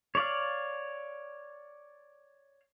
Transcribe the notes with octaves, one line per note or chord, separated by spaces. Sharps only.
C#5 D5 F5